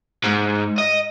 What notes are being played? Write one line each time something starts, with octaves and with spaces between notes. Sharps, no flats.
G#2
D#5